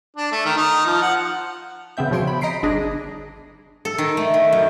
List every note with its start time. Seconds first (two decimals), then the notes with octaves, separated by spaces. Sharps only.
0.16 D4
0.32 A3
0.45 D#3
0.57 D#4
0.86 F3
1.02 F#5
1.97 C#3 B3 C4 E5 G6
2.11 B2 F3 C#5 C6 D7
2.27 B5
2.41 D#5 A#5 B6 C7 D7
2.63 G1 D4 G#4 A#6
3.85 A4
3.98 D#3
4.17 A3
4.34 D#3
4.53 F#2